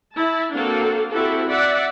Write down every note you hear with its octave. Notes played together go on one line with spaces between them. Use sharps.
E4 A5
A#3 C4 D4 F#4 A4 F5
C4 E4 F#4 G4 A4
D5 E5 F#5